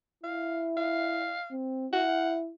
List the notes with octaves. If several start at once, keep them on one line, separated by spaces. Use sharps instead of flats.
E4 F5
F5
C4
E4 F#5